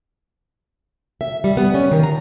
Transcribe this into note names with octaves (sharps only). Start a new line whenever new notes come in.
E5
G3
B3
C#4
D#3
A#5